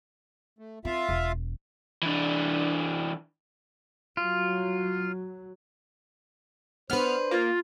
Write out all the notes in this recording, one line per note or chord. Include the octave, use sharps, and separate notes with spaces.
A3
C4 F4 E5 F5
E1
E3 D4
F#3 F4
B3 D4 B4 C5 F6
A#3 F4